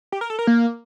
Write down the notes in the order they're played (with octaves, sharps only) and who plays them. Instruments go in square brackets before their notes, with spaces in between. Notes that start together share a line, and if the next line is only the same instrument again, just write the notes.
[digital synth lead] G4
A#4
A4
A#4
A#3